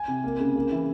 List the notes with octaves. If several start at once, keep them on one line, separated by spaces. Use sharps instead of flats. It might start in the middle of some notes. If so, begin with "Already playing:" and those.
Already playing: G#5
C3
A#3
C#3
A#3
E3